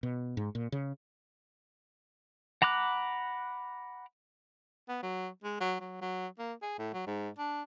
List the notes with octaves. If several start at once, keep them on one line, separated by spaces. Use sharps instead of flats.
B2
G#2
A#2
C#3
F#5 A#5 B5 D6 F#6
B3
F#3
G#3
F#3
F#3
F#3
A#3
G#4
A2
F#3
G#2
D4